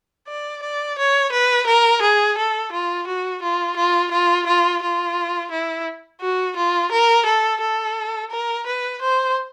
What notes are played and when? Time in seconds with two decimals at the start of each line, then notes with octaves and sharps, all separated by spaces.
0.28 D5
0.63 D5
0.98 C#5
1.32 B4
1.67 A#4
2.02 G#4
2.37 A4
2.72 F4
3.07 F#4
3.42 F4
3.76 F4
4.11 F4
4.47 F4
4.82 F4
5.51 E4
6.21 F#4
6.56 F4
6.92 A#4
7.26 A4
7.61 A4
8.30 A#4
8.66 B4
9.01 C5